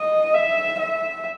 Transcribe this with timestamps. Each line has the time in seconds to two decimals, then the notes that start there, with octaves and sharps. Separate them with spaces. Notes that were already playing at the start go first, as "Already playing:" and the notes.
Already playing: D#5
0.34 E5
0.79 E5